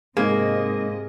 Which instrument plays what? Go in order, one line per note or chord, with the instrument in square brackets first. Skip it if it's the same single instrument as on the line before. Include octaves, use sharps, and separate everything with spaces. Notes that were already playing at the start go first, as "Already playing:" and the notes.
[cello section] G#2 C3 D#5 [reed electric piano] G#3 C4 D#4 [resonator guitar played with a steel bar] A#3 [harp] G#4